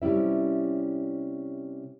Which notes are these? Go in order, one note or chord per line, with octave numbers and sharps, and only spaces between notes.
C3 G3 C#4 E4 E5